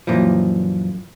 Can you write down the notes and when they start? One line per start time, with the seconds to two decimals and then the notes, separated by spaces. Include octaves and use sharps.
0.07 F#2 A#2 E3 F3